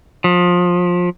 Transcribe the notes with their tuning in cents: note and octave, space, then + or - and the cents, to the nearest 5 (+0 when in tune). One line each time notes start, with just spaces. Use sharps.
F3 +25